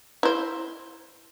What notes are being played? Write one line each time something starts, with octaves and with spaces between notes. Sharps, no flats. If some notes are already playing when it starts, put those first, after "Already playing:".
E4 C5